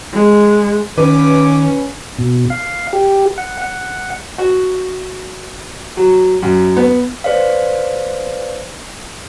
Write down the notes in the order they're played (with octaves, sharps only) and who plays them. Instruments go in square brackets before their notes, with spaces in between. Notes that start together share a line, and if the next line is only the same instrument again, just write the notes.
[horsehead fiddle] G#3
[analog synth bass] D#3 [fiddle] C#4 [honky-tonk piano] B4 [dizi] D6
[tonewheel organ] B2
F5
G4
F#5
F#5
[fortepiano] F#4
F#3
F#2
B3
[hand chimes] B4 C5 D5 F5